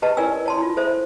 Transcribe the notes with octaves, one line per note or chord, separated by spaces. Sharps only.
G4 B4 D#5 A5
E4 A#4 C#5 D5 G#5 E6
C#5 A5 C6
E4 F4
A4 C5 E5